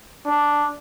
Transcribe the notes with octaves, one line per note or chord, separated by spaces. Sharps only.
D4